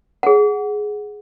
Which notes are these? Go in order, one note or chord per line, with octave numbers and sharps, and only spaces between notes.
G#4 F#5